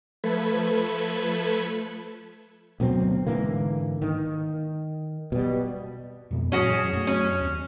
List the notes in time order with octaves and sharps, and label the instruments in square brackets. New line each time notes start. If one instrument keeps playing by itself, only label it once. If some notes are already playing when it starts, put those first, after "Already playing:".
[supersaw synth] F3 A3 A4 B4 B5 G#6
[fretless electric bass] D2 B2 F#3 C4
G#2 D3 E3 A#3
D#3
B2 G3
[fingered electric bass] F2 B2 A#3
[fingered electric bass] F#2 A#2 E3 [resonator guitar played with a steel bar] C#4 F#4 G#4
[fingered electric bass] F#2 A3
[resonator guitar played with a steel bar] C#4
[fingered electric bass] D#2